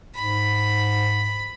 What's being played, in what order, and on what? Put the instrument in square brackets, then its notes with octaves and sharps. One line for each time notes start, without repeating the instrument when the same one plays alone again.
[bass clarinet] G#2 [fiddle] B5